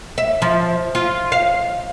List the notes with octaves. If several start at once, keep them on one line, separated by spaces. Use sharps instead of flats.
E5
F3
F4
F5